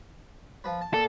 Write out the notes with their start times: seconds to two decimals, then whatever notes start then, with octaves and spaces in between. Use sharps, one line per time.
0.64 F3 B4
0.81 A5
0.94 A#2 A4